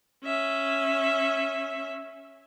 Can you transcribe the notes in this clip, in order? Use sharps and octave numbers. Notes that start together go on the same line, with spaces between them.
C#4 E5